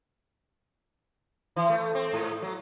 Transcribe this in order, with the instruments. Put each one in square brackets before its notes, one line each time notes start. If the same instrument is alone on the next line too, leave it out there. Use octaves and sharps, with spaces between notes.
[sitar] E3
A3
C4
G#2
F#3